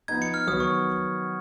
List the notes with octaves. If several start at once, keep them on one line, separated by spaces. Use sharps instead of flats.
F3 B3 D#4 G#6
C#7
F6
D#3 F#3 B3 F#4 B4 D#6
C#6